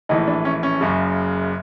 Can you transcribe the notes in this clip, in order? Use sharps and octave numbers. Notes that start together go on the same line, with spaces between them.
A#1 A2 E3 D#4
D4
C#4
C#4
F#1 F#2 C#3